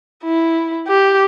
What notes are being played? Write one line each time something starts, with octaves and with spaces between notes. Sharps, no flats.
E4
G4